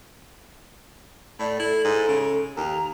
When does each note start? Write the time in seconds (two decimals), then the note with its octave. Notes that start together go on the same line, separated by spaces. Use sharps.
1.40 A2 D5
1.60 E4 A4
1.84 G#2
2.08 C#3
2.57 D#2 A#5